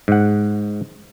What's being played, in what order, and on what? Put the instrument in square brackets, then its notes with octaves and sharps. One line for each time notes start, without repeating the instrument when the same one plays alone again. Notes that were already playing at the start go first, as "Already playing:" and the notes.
[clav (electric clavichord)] G#2 F#5